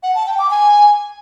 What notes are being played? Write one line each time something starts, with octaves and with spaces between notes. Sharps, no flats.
F#5
A5
G5
D6
G#5